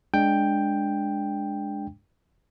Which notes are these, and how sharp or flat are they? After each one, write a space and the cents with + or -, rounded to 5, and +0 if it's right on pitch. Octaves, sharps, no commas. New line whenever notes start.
G#3 +0 D4 +0 G5 +5